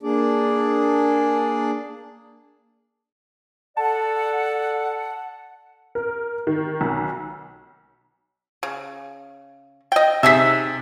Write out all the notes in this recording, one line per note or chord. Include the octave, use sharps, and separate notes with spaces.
A#3 D4 G#4 D5
A4 D5 F#5 A5
A#4
D#3
B1
C#3
D#5 G5
C3 D#4 G#4 E5 B6